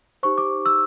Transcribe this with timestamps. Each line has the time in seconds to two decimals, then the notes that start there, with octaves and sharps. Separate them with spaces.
0.23 D#4 G4 C5 C#6
0.38 D6
0.66 E6